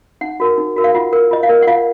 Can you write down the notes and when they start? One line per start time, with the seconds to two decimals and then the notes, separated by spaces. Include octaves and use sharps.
0.21 D#4 F#5
0.40 F#4 A#4
0.58 D#4
0.76 F#4 A#4
0.84 F5
0.94 F4 F#5
1.13 A#4
1.31 F4 D#5
1.43 F5
1.49 A#4
1.62 F#5
1.67 F4 F5